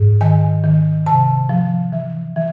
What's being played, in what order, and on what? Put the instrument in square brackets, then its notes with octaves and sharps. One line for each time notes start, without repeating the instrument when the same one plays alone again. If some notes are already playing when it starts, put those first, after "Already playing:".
Already playing: [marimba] G#2
D#3 G#5
D#3
C3 A5
F3
E3
E3